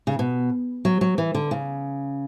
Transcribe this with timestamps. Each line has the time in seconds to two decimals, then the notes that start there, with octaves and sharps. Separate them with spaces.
0.07 C#3
0.19 B2
0.85 F#3
1.01 F#3
1.18 E3
1.35 D3
1.51 C#3